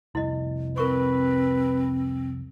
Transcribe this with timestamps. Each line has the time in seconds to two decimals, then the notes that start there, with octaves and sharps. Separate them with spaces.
0.15 F1 C2 E4 D#5
0.78 C4 A#4 B4 C#6